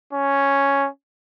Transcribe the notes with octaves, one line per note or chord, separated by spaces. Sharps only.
C#4